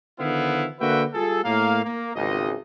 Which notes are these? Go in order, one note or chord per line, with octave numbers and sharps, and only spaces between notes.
D3 D#3 F3 B3 E4 F5
D3 A#3 F#4 B4 E5 G5
G3 F4 G#4 A4
A2 A#3 F5
A#3
G#1 C#2 D#5